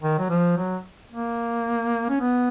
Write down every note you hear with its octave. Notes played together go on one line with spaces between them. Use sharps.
D#3
F#3
F3
F#3
A#3
C#4
B3